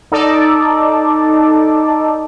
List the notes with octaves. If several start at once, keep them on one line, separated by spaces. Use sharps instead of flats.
D#4 A4 D5